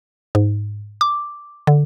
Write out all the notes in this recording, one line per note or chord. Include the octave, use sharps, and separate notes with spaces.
G#2
D6
D3